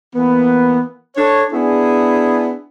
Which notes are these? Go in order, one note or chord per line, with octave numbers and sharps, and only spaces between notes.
E3 A#3 B3
D4 A4 C#5
B3 D4 E4 G#4